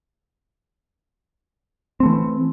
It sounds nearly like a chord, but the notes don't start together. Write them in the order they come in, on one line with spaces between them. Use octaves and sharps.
C4 A3 E3